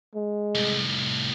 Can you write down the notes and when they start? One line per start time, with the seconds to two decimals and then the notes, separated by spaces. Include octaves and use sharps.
0.15 G#3
0.55 C2 A2